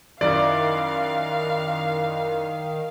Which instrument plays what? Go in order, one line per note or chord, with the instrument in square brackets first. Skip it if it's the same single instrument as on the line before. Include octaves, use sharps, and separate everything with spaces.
[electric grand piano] F#2 E4 [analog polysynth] D#3 [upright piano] D5 [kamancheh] F5